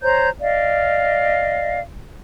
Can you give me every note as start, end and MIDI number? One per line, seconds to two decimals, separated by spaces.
0.03 0.29 72
0.03 0.29 73
0.03 0.29 82
0.03 0.29 91
0.41 1.80 74
0.41 1.80 75
0.41 1.80 77